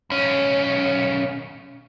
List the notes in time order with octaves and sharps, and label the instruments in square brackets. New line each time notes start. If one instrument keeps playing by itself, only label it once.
[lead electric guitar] B1 C#4